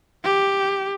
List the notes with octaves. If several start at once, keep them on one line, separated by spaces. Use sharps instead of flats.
G4